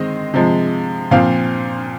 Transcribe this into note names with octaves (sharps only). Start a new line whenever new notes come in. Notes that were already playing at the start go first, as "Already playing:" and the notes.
Already playing: D#3 G#3 C4 D#5
C3 F3 G#3
A#2 F3 C4 F5